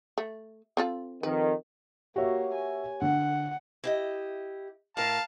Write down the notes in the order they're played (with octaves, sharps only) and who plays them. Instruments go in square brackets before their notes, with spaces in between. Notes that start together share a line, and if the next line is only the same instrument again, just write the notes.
[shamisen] A3
C4 F4 A4
[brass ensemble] F2 D#3 [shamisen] B4
[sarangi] A#3 [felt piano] F#4 E5 [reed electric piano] G4 C#5
[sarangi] G#5
[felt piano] D3 [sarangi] F#5
[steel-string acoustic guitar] E4 G4 D#5
[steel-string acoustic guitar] A2 A#4 [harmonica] F5 A5